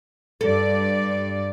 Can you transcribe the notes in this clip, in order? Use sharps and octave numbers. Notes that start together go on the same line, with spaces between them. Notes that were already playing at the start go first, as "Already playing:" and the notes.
G2 A4 D5